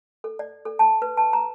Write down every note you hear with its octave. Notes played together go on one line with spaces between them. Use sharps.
A4
D5
A4
A5
B4
A5
A#5